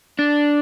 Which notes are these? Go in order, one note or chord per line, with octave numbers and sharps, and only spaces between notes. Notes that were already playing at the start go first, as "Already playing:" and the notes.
D4